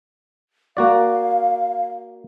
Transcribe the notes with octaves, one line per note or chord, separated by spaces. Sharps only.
A#3 F#4 D5 F5